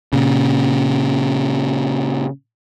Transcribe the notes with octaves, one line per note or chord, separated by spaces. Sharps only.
A#2 C#3